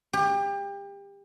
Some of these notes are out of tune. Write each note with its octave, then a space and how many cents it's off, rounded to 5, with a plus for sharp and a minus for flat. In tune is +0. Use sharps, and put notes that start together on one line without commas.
G4 +30